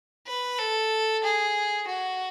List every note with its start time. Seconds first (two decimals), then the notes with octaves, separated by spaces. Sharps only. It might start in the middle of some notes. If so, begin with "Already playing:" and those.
0.27 B4
0.59 A4
1.24 G#4
1.88 F#4